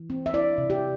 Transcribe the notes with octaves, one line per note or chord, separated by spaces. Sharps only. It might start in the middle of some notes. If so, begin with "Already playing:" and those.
Already playing: E3
C4
E5
E4 D5
C3
G4